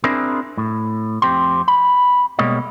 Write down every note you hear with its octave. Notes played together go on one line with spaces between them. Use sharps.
C4 D4 E4 G#4 A#4 C5
A2
F2 C4 G4 C6
B5
B2 G3 G#3 A#3 C#5 D#5